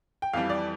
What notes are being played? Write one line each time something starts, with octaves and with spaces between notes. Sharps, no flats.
G5
F2 E3 G3 F5
D5